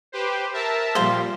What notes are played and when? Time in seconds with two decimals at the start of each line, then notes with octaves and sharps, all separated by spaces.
0.12 G4 B4 C5
0.53 A#4 E5 A5
0.95 A#2 F3 G3 C5 F5